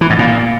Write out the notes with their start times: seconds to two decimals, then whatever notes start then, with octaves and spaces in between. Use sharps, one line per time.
0.01 E3
0.10 G#2
0.19 A#2